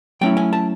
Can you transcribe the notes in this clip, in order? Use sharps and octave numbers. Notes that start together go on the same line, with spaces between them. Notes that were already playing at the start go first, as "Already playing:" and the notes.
F#3 A3 C#4 E4 G5
G#5
A5